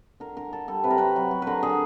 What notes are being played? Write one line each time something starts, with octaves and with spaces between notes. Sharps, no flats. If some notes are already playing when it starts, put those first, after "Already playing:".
D3 A#4
D3 A#4
D3 A4
G3 A4
C3 B4
A#4
F#3 B4
F#3
F#3
D3 A#4 B4
D3 G#4